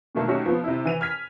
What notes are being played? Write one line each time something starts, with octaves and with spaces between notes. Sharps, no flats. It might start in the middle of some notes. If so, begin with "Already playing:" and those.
B2 D3 D#3 F#3 A3 A#3
F#3 A3 C#4 D#4 F#4 G4
F3 B3
C3 E4
E3 D#7 F7
F6 G#6 B6